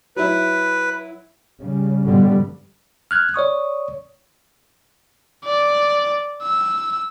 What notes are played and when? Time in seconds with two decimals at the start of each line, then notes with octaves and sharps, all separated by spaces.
0.16 F#3 E4 B4
1.60 C#3 G3
2.04 G2 B2 D3 F3 G3 B3
3.11 F6 F#6 G#6
3.34 C#5 D5 C#6 D#6
5.45 D5
6.42 E6